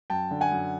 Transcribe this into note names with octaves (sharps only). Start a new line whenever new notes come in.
F#2 G5 A5
D3
F#5 G#5
F#2